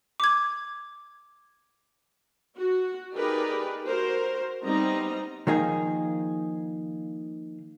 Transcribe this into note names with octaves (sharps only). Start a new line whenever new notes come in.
D6 G#6
F#4
D#4 G4 G#4 A#4 B4 D5
F#4 A#4 C5
G3 B3 C4 D#4 D#5 A#5
D#3 F3 A#3 D#4 G#4